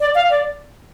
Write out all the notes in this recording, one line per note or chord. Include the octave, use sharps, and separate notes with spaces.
D5
F5
D5